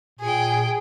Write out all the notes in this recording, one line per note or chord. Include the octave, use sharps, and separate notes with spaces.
A#2 G#4 G5